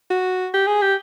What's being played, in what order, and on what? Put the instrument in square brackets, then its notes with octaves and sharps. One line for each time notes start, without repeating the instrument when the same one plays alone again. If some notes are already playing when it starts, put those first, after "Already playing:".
[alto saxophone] F#4
G4
G#4
G4